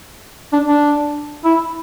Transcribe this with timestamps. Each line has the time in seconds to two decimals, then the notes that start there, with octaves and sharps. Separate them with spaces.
0.53 D4
0.68 D4
1.44 E4